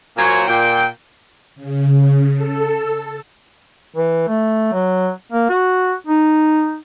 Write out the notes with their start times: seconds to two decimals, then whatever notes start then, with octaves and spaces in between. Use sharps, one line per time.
0.17 A#2 F#3 A#3 C5 C#5 G#5
0.48 A#2 G5
1.56 C#3
2.34 A4
3.94 E3
4.28 A3
4.73 F#3
5.32 A#3
5.49 F#4
6.07 D#4